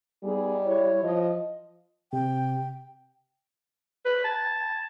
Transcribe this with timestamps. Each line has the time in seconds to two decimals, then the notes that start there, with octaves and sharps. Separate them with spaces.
0.24 G3 B3 D#4 G#4
0.66 E4 C#5
1.03 F3 D#5
2.13 C3 G5
4.05 B4
4.24 A5